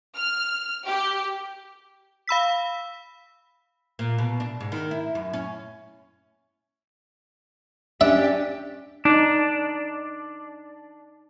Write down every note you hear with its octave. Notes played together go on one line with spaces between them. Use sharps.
F6
G4
F5 B5 E6 B6
A#2
B2
D4
G#2
D#3
E4
F#2
C#4
C#4 D4 G4 E5
D4 D#4